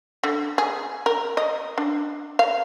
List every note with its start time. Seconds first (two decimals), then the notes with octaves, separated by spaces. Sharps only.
0.24 D3
0.58 G#4
1.06 A#4
1.37 D#5
1.78 D4
2.39 F5